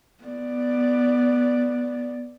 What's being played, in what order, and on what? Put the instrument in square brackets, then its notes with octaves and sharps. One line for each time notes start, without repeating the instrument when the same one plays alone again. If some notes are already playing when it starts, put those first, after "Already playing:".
[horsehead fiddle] B3 D5